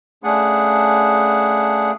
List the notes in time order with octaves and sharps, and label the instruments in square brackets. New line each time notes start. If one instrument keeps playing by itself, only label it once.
[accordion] C#3 A3 D4 G#4 F#5